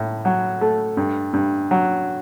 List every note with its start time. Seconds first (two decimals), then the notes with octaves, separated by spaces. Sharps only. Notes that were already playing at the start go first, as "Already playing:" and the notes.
Already playing: A2
0.25 F#3
0.61 A3
0.97 G2
1.33 G2
1.71 F#3